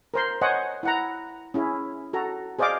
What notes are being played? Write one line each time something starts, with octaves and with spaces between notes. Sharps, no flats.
A#4 C5 C6
C5 C#5 D#5 F#5 G#5
E4 F#5 A#5
C#4 E4 G#4
F#4 A4 A#5
G#4 C5 D5 D#5 F5 D6